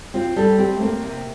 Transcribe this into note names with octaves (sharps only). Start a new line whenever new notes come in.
C4 F4
G3 A4
C4 G4
A3
A#3 C4
C3